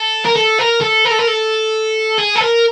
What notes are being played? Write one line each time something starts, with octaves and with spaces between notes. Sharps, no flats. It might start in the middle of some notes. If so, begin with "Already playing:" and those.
Already playing: A4
A#4
A4
A#4
A4
A#4
A4
A#4
A4
G#4
A4
A#4